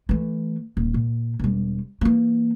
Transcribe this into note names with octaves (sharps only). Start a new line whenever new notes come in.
E3 A3
D#1
A#2
E1 G3
E3 A#3